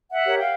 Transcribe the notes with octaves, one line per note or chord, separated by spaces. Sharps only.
E5 F#5
G4 A#4 C#5
F5 G5